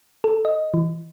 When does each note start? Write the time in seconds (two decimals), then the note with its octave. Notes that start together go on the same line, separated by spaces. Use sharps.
0.24 A4
0.45 D#5
0.74 E3